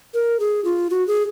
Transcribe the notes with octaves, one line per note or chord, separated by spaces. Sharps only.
A#4
G#4
F4
F#4
G#4